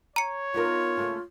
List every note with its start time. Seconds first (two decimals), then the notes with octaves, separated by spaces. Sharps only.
0.16 C#5 A#5 C#7
0.54 B3 D#4 F4 A#4
0.97 C#3 A3 A#3